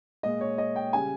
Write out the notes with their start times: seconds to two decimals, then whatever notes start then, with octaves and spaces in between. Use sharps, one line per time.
0.23 A#2 G#3 D#5
0.41 C#5
0.58 D#5
0.76 G5
0.93 C#3 G3 G#5